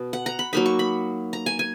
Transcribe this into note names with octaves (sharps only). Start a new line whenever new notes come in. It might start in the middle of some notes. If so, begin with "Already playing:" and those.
Already playing: B2
F#5
A#5
B5
F#3 A#3 D#4 B5
C#6
B5
A#5
G#5
G#5